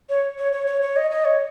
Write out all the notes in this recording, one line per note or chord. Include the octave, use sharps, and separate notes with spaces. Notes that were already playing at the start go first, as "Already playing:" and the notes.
C#5
C#5
C#5
C#5
C#5
D#5
D#5
C#5